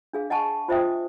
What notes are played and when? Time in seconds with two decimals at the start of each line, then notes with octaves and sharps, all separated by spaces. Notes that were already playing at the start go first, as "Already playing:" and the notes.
0.13 D4 G#4 F5
0.30 D#5 F#5 G#5 A5 C#6
0.68 F4 C5 D#5 E5 G5 D#6